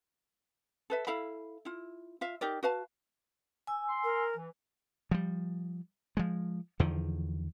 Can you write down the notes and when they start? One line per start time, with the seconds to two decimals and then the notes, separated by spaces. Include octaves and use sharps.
0.90 A4 B4 E5
1.07 E4 A4 F5 B5
1.65 E4 F4
2.21 F4 E5 F5
2.41 D#4 G4 A#4 D5
2.63 F#4 B4 F5 A5
3.67 G#5 E6
3.88 C6
4.04 A#4
4.36 E3
5.11 F3 G3
6.17 F3 G#3
6.80 E2 D3 D#3 F3